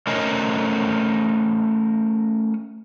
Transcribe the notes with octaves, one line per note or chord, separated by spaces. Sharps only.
A3 C#4 A#4 C5 C#5 D#5